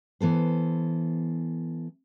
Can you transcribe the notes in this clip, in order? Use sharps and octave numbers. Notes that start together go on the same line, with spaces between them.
E3 B3 A4 C5